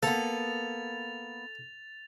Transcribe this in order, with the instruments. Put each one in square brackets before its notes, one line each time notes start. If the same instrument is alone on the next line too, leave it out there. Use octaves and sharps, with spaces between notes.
[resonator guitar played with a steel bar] A#3 B3 [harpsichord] A4 [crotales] A6 F7